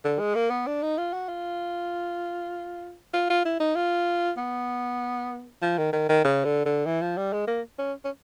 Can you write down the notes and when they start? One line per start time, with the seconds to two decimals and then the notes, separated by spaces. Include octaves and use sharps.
0.04 D3
0.19 G#3
0.35 A#3
0.50 B3
0.67 D4
0.82 D#4
0.98 F4
1.13 F#4
1.29 F4
3.13 F4
3.30 F4
3.45 E4
3.60 D#4
3.75 F4
4.37 B3
5.62 F3
5.78 D#3
5.93 D#3
6.09 D#3
6.24 C#3
6.45 D3
6.66 D3
6.86 E3
7.01 F3
7.17 G3
7.33 G#3
7.47 A#3
7.78 C#4
8.05 C#4